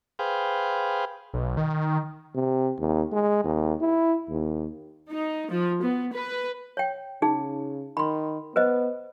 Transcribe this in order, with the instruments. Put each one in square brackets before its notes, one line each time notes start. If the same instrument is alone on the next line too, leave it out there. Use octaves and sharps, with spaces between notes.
[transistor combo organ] G#4 B4 C5 F5 G5
[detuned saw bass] B1
D#3
[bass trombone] C3
D#2
G#3
D#2
E4
D#2
[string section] D#4
F3
B3
B4
[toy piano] C#5 G5
[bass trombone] C#3 [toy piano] D#4 G#4
[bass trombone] D#3 [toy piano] B5 C6
[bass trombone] B3 [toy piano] B4 C5 D#5